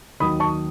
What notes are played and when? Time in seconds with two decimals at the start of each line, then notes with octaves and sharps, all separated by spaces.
0.20 D#2 D#3 F#3 B5 D#6
0.40 A5 C#6